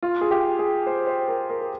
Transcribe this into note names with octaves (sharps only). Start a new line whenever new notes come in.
F4
G#4
G4
G#4
C5
C5
A#4
A#4
A#4